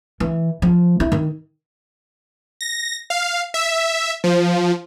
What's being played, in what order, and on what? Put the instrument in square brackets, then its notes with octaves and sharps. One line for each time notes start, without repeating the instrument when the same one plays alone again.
[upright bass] E3
F3
E4
D#3
[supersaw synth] A#6
F5
E5
F3